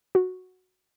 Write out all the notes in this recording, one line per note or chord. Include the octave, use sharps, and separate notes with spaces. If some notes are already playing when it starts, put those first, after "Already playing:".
F#4